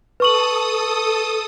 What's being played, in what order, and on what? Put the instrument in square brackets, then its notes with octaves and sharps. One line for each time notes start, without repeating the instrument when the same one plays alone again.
[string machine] A4 D#6 [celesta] B4 C#6 F#7